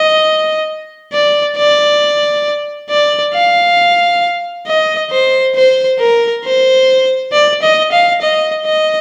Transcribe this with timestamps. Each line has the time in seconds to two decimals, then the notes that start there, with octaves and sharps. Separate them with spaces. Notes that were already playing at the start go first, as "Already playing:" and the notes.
Already playing: D#5
1.13 D5
1.57 D5
2.90 D5
3.34 F5
4.67 D#5
5.11 C5
5.55 C5
5.99 A#4
6.45 C5
7.33 D5
7.62 D#5
7.92 F5
8.22 D#5
8.65 D#5